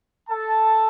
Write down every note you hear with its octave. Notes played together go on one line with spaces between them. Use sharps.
A4 A5